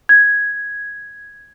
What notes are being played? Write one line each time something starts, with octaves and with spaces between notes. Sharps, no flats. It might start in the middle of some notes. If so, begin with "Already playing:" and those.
G#6